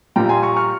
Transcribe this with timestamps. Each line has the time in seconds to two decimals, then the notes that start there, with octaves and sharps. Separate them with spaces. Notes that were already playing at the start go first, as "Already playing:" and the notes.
0.16 A#1 A#2 G3 G5 A#5
0.29 G#5 C6
0.43 A#5 C#6
0.56 C#6 F6